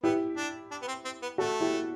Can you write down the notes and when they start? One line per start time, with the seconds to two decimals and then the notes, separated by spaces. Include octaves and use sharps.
0.03 B3 E4 G4
0.37 D4
0.71 D4
0.82 B3
0.88 C4
1.05 C4
1.22 B3
1.38 A3 F#4 A4
1.61 E4 G4